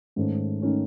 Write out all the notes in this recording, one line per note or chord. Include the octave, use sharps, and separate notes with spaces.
G#2 D#3 A3 C#4
D#3 A3 C#4